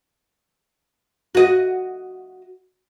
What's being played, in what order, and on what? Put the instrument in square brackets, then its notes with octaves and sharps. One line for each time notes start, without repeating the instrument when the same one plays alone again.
[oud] F#4 D#5